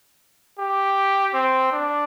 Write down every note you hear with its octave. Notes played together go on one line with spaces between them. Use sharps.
G4
C4
D4